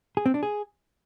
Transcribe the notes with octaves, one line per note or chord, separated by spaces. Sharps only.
G#4
C4
D4
G#4